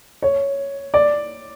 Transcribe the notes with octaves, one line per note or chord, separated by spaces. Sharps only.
C#5
D5